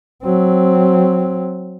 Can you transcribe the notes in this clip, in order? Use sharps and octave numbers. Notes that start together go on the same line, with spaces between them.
F#3 C4